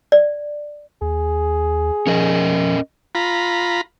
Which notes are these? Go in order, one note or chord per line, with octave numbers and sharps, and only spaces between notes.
D5
D#2 G#4
F3 C#4 A#4 D#5
F4 A#5 B5